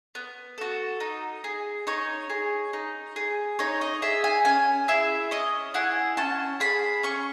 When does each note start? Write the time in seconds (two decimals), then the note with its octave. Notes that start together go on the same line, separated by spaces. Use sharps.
0.15 B3
0.58 F#4 A4
1.00 D#4
1.44 G#4
1.87 D#4 C#5
2.30 G#4
2.73 D#4
3.16 G#4
3.59 D#4 C#5
3.81 D#5
4.02 G#4 E5
4.24 G#5
4.45 C#4 G#5
4.88 E4 G#4 E5
5.31 C#4 D#5
5.74 E4 G#4 F#5
6.17 C#4 A5
6.60 G#4 B5
7.03 C#4 C#6